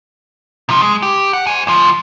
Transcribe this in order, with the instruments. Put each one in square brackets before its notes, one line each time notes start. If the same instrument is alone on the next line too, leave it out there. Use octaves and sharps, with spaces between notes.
[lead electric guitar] C3 F3
G#3
G4
F#5
C5 G#5
D2 F3